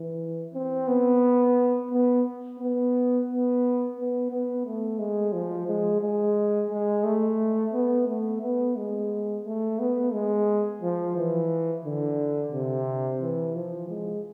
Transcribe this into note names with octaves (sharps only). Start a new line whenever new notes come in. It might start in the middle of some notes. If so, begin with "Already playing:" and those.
Already playing: E3
C4
B3
B3
B3
B3
B3
B3
A3
G#3
F3
G#3
G#3
G#3
A3
B3
A3
B3
G#3
A3
B3
G#3
F3
E3
D3
C3
E3
F3
G#3